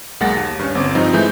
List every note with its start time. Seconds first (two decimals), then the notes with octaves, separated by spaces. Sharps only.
0.20 B1 G#3 A#3 F#5 A6 A#6
0.37 D#2
0.59 G2 C#4
0.75 G1 C4 D6
0.95 G2 F3 C4 D#4
1.13 E3 G#3 A3 E4 G6